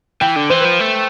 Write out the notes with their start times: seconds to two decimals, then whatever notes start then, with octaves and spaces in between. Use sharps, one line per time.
0.21 E3 G5
0.36 D3
0.50 E3 C5
0.61 F3 B4
0.79 A3